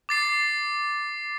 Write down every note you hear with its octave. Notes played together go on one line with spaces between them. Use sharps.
D6 A6 C7